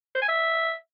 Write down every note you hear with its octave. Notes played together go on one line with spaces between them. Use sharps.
C5
G#5
E5